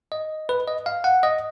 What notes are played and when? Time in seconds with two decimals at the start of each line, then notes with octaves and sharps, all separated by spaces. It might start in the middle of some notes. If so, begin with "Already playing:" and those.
0.12 D#5
0.49 B4
0.68 D#5
0.86 F5
1.04 F#5
1.23 D#5